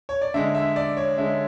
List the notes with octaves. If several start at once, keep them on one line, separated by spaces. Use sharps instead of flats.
C#5
D5
D3 G#3 E5
E5
D5
C#5
D3 G#3 E5